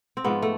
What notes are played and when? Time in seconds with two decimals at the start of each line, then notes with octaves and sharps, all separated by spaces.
0.17 C4
0.24 G#2 F3 B3
0.42 A3